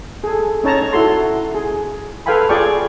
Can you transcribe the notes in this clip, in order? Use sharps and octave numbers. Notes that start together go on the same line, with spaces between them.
G#4 A4
C#4 D#4 C#5 A5 A#5
E4 F#4 A4 C6
G#4
A4 B4 F5 G5 G#5 B5
F4 G#4 D5 G5 C#6